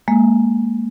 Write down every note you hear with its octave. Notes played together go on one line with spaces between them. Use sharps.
G#3 A#3